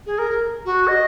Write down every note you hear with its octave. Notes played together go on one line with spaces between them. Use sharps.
G#4
A#4
F#4
D#5